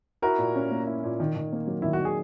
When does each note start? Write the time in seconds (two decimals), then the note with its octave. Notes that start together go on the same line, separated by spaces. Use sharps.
0.22 E4 F#4 A#4
0.38 A#2
0.56 C#4
0.71 A#3
0.87 E4
1.04 A#2
1.20 D#3
1.36 D#3
1.52 A#3
1.67 F#3
1.82 D#3 E4
1.93 F#4
2.00 D#3
2.05 G#4